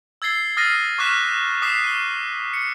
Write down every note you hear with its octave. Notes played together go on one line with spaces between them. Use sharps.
E6 G#6 A6 C7 G7
D#6 F6 A6 A#6 C7 D#7
C#6 D6 F6 F#6 B6 E7
D6 D#6 B6 C7 E7
D#7 G7
C#7